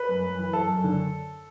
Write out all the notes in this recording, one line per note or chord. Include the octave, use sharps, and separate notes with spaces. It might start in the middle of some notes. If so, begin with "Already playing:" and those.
Already playing: B4
F#2
F#2
E3
F#2 A4
F#2
D3